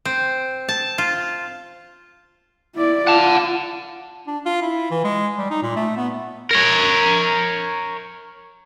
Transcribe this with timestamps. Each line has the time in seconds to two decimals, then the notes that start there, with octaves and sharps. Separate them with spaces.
0.05 C4
0.69 A5
0.98 F4
2.76 E4 D5
3.07 F4 F#5 A5
4.27 D4
4.46 F4
4.62 E4
4.91 E3
5.04 G#3
5.38 G3
5.50 D#4
5.62 A#2
5.76 A3
5.97 B3
6.51 A#4 C#5